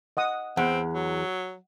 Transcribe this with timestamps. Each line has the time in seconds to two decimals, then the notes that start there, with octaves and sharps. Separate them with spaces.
0.17 D#5 F#5 D#6
0.57 E2 C4 F#5
0.94 F#3